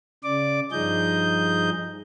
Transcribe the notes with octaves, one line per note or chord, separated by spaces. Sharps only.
C#3 D5 D6
G2 F3 D#4 G#4 D#5 G6